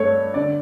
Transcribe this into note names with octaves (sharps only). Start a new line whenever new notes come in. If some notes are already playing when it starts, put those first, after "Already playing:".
Already playing: G2 A3 A4 C#5
D3 D5